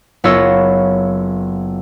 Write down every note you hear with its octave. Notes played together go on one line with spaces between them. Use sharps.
F#1 B3 F4 C#5 E6 A#6